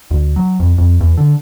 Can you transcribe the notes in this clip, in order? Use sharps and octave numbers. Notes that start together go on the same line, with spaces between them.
D2
F#3
F2
F2
E2
D3